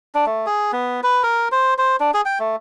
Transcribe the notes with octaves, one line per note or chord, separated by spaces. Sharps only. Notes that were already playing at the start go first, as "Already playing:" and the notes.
D4
A3
G#4
B3
B4
A#4
C5
C5
D4
G#4
G5
A3